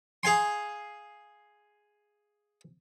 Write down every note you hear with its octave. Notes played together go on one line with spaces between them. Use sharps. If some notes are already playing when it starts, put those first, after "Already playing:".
G#4 F5 G#5 C6